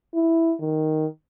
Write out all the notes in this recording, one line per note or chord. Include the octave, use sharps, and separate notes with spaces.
E4
D#3